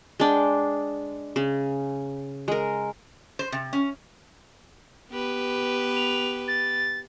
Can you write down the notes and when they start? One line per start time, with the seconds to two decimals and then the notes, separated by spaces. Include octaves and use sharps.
0.20 G#3 D4 G5
1.36 C#3
2.48 G#3 A#4
3.39 C5
3.52 C3
3.73 C#4
5.10 B3 G4 B4
5.96 F7
6.48 A6